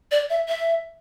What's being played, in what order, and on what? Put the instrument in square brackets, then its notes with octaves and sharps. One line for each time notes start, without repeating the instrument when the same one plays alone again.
[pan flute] D5
E5
E5